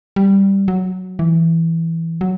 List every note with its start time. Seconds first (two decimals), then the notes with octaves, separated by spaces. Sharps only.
0.16 G3
0.68 F#3
1.19 E3
2.21 F#3